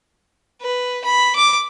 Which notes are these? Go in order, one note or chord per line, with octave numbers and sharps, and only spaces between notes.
B4
B5
D6